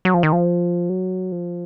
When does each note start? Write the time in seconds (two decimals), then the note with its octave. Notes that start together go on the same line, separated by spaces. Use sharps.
0.05 F#3
0.14 F3
0.23 D#3
0.33 F3
0.89 F#3
1.32 F3